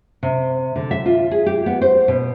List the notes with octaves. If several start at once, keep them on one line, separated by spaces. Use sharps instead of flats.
C3
D3
E5
F4
G#4
G4
B3
C5
B2